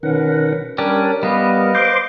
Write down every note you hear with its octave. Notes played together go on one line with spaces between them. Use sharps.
B2 D#3 C#4 A#4 B4 F#5
G3 C#4 D4 G4 A#4
G3 B3 B4 D#5 F5
A#4
C5 C6 D6 G6